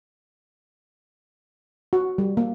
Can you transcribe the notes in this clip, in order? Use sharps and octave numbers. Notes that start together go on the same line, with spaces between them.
F#4
G3
A#3